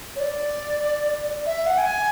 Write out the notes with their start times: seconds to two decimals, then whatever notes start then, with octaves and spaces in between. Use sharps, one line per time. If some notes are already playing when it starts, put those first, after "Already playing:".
0.16 C#5
0.20 D5
1.46 E5
1.66 F#5
1.78 G#5